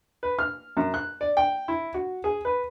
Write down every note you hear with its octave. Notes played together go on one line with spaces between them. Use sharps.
B4
F6
F#2
F#6
D5
G5
E4
F#4
G#4
B4